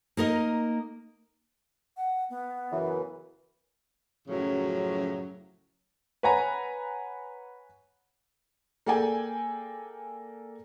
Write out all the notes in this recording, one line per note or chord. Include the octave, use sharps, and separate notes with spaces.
A#3 D#4 A#4 D#5
F#5
B3
F#2 C#3 E3
F#2 A2 C#3 F3 F#3
B4 C#5 F#5 G#5 A#5
A#3 G#4 A4 D5 G5 G#5